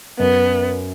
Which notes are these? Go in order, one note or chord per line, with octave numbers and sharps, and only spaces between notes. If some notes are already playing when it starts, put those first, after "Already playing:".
F#2 B3